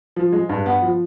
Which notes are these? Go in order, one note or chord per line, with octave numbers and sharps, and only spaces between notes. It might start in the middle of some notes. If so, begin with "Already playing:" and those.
F3
G#3
G2
B3
F3